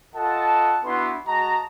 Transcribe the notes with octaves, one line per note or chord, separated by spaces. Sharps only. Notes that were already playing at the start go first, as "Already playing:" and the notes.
F4 A4 D#5 F#5 A5
B3 D4 E4 F#4 B4 C6
G#3 F#4 D#5 A5 A#5